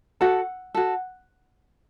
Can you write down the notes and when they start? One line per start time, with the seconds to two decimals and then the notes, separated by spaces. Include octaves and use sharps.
0.21 F#4 A4 F#5
0.74 F#4 A4